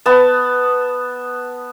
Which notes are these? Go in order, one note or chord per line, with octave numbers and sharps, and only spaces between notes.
B3 A5